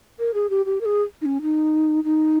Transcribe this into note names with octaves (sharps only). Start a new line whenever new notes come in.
A#4
G#4
G4
G4
A#4
G#4
D#4
C#4
D#4
D#4